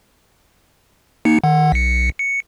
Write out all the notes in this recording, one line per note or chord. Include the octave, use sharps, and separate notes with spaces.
A#3 D#4 C#7
D#3 F#5
B1 C#7
C#7